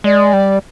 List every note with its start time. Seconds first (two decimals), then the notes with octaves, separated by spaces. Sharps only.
0.04 G#3 D5
0.33 G3